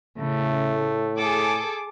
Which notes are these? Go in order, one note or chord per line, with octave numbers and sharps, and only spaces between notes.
A2 C#3 A3
G#4 A4 D6